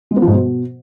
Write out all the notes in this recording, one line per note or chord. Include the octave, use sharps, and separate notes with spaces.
G#3
B3
F3
G#2
B2